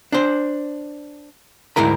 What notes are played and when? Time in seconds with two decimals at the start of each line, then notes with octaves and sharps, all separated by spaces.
0.12 D4 C5
1.76 D2 G#2 E4 A#4 B5